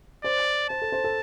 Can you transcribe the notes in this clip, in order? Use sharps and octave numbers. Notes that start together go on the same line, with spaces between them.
C5 D5
C5 A5
A4
C5
A4